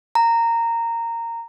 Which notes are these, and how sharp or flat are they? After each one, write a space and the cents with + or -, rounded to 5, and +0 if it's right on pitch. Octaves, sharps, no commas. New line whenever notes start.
A#5 -15